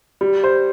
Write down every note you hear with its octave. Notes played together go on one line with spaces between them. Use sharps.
G3
C5